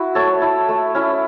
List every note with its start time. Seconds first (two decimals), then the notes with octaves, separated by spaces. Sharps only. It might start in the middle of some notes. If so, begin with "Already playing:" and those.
Already playing: E4 F#4
0.15 A3 A4 C#5
0.42 E4
0.68 A3
0.95 C#4 E4